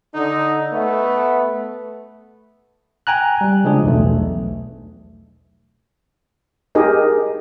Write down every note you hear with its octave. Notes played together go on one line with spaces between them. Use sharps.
D3 D#4
A3 B3
G5 G#5 A#5 F#6
G3
C#3 F3 G#3 D4 G#4
B1 E2 A3
D#4 G4 G#4 A#4 D#5